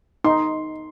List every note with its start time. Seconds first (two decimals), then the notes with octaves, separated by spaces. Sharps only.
0.24 D#4 C6